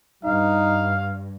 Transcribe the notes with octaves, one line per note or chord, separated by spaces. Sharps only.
G2 D#4 F5